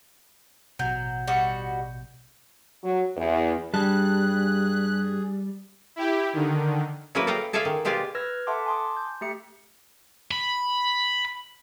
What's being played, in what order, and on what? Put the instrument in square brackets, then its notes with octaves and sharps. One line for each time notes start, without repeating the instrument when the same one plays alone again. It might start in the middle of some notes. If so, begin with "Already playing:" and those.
[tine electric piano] A1 B2 G6 [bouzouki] F#3
[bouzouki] G3 F#4 D#5
[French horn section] F#3
E2
[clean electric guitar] G2 A5 [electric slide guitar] G3 [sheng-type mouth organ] G#4 [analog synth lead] F#6
[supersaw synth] E4 G4
D3 D#3
[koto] F#3 G#3 A#3 E4 A#4 B4
A4 D#5 F5 G5
G#4 A4 D5 E5 F5 G#5
D#3
B2 G#3 F4 G4 D5 G#5
[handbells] B4 E6 F6 G#6 A#6
A4 E5 F#5 A5 C6 D6
G#5 A5 C6 D6 D#6
G6
A3 G4 E5 C#7
[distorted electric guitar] B5